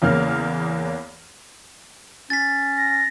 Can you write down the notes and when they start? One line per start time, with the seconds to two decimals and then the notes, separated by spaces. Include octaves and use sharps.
0.02 E2 C#3 A#3 F6
2.30 C#4 A6 B6
2.77 A#6